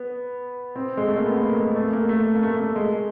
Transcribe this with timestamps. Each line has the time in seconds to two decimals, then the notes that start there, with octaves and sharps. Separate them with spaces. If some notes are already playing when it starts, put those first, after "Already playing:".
Already playing: B3
0.76 C4
0.97 G#3
1.08 A3
1.16 A#3
1.26 B3
1.43 A#3
1.59 G#3
1.76 A3
1.93 A#3
2.09 A3
2.35 A#3
2.43 A3
2.60 A3
2.76 G#3